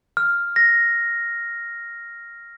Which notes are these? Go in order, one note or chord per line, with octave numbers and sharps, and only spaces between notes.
F6
A#6